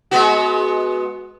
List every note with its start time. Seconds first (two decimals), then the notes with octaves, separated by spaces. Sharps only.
0.11 G#3 B3 F#4